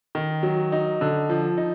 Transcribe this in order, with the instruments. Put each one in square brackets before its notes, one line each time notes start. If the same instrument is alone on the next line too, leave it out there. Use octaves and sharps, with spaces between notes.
[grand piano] D#3
F#3
D#4
D3
F3
D#4